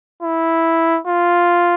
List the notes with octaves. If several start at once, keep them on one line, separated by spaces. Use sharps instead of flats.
E4
F4